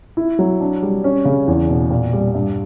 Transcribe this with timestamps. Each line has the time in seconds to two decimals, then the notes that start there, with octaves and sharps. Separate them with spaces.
0.17 E4
0.39 F#3
0.60 D4
0.82 G3
1.04 C#4
1.25 C#3
1.48 E2
1.69 B2
1.91 A#2
2.13 G3
2.34 G2